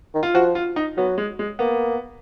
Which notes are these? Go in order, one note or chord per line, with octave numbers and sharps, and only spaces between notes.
D#3
F4
F3 F#4
F4
D#4
F#3 B3
G#3
G#3
A#3 B3